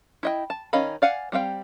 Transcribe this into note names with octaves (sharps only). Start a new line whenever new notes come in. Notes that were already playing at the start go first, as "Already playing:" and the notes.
E4 D#5 G5
A5
D#3 C#4 D#5 F5 B5
D5 F5 F#5 G#5
G3 C4 F5 G5